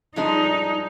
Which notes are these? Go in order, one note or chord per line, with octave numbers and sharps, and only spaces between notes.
G2 F3 G#3 D4 D#4